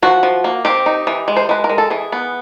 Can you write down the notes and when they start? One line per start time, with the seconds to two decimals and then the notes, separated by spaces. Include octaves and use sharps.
0.02 F3 F#4
0.23 F3
0.44 A#3
0.65 C4 G4
0.86 D#4
1.07 E3
1.28 G#3
1.36 C5
1.49 G#3 B4
1.64 A#4
1.69 G#3
1.78 A4
1.90 E3 G#4
2.12 B3